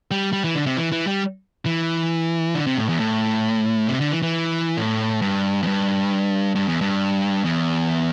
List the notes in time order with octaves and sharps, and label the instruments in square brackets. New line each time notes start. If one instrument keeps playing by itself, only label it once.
[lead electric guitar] G3
G3
E3
D3
C3
E3
E3
G3
E3
D3
C3
A2
E2
A2
C3
D3
E3
E3
A2
G2
E2
G2
G2
E2
G2
E2